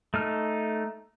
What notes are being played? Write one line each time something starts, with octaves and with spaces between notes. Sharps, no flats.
A3 D#4 F6